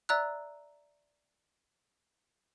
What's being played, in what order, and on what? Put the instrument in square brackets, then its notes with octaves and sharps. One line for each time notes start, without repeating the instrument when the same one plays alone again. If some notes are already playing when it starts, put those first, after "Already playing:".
[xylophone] D5 E5 A#5 E6 F#6